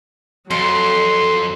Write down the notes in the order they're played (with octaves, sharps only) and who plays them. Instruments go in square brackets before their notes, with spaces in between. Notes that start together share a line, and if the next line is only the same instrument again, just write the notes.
[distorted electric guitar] F2 [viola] F#3 [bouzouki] A4 [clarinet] C6